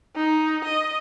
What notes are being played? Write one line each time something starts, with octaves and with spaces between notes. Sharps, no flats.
D#4
D#5